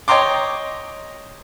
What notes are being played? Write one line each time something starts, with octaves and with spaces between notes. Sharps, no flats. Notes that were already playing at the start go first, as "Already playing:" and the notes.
C#5 D#5 G5 A#5 C6 D6